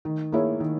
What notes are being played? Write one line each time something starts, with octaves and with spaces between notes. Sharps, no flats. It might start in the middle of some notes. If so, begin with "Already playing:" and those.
D#3
A#3 E4 G#4 C#5
D#3